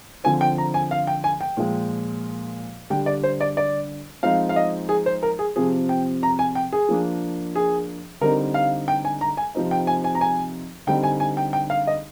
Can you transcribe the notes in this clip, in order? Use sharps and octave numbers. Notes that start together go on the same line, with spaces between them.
D3 F3 C4 G#5
G5
A#5
G#5
F5
G5
G#5
G5
A#2 F3 G#3
D3 G3 D4 G5
D5
C5
D5
D5
F3 G#3 C4 D#4 F5
F5
D#5
G#4
C5
A#4
G#4
C3 F3 C4 G#4
G5
A#5
G#5
G5
G#4
F3 A#3 D4
G#4
D3 G3 C4 D#4 A#4
F5
G5
G#5
A#5
G#5
C3 F3 C4 D#4
G5
G#5
G#5
A#5
G#5
D3 G3 C4 D#4 G5
G#5
G#5
G5
G5
F5
D#5